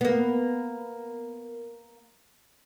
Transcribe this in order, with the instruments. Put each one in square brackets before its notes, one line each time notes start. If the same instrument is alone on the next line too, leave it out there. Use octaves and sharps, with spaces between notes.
[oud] A#3 B3